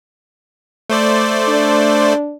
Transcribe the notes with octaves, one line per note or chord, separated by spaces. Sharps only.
A3 C5 D5
D4